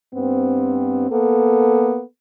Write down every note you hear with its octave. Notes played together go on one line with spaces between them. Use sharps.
G2 B3 C4
A#3 B3 A4